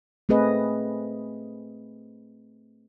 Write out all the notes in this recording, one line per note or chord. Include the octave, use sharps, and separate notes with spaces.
A3 C4 G#4 B4 D#5